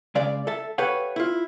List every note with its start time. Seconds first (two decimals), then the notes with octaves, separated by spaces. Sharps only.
0.15 C#3 G#3 D5 F5
0.47 A4 E5 A5
0.78 G4 A4 B4 C#5 F5 F#5
1.16 E4 F4